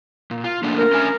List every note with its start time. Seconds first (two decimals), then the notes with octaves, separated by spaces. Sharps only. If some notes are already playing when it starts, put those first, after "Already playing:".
0.31 A#2
0.44 F4
0.63 A3 A#3 D4
0.77 A#4
0.92 C#4 E5 G#5